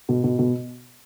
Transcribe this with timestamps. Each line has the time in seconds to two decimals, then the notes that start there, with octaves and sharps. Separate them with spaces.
0.09 B2
0.24 B2
0.39 B2